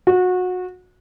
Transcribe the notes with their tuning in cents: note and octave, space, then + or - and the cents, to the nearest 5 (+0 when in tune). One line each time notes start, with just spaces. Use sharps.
F#4 -25